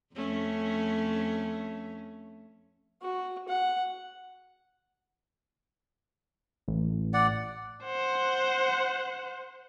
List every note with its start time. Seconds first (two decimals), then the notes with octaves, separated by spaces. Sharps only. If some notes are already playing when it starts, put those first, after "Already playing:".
0.15 F2 A3 C#4
3.02 F#4
3.48 F#5
6.68 A1
7.14 D5 F#5
7.84 C5 F#5